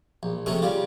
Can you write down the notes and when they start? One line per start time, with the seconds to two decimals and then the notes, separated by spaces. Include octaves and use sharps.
0.23 A#1
0.46 C3 G#3 A3 C#4
0.62 C#3 G3 F4